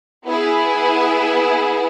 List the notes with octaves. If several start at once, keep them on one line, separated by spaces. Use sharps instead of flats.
B3 E4 G#4